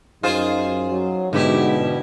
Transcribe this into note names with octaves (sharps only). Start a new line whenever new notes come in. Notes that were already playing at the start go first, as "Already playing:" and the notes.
F#2 D#4 F4 G#4 C5
F#3
G#2 B2 D3 E4 G4